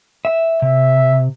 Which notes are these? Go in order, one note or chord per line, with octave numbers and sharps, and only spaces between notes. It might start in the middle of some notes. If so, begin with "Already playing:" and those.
E5
C3 E5